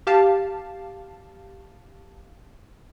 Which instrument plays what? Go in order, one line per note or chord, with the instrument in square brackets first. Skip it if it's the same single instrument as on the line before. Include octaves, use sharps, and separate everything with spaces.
[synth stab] G4 F5 A5